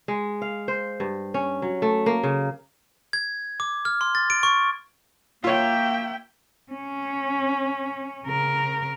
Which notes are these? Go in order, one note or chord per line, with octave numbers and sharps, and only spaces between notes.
G#3
F5
C5
G2
C#4
F#3
A3
A#3
C#3
G#6
D6
F6
C6
A6
D7
C#6
A#3 F4 C#5 E5 G5
C#4
C#3 A#4